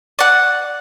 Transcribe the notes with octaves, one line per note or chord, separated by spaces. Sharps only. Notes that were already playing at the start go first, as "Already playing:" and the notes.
D5 F#5